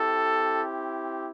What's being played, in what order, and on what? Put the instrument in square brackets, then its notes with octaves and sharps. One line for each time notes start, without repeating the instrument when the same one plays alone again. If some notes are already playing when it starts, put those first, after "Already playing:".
Already playing: [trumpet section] C4 E4 G4 A4